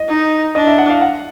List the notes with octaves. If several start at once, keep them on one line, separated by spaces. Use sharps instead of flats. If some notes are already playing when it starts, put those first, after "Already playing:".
Already playing: D#5
D#4
D4 D#5
E5
F#5
F5
F#5